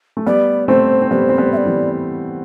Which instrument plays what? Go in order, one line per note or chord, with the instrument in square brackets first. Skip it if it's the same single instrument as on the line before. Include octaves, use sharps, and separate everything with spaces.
[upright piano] A3
[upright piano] G3 B3 [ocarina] D5
[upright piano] A3 C4 [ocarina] C5
[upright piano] C4
[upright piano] G3 B3 [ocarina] C5
[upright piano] C4
G3 B3
[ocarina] E5
D5
[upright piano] E3 G3